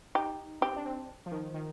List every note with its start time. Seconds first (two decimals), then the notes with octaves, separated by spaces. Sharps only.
0.15 D#4 G4
0.61 C4 G4
0.76 D4
0.85 C4
1.26 F3
1.32 D#3
1.54 D#3